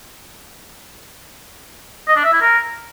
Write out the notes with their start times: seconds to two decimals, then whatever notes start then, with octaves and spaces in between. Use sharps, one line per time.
2.08 D#5
2.16 D4
2.25 E5
2.33 E4
2.41 A#4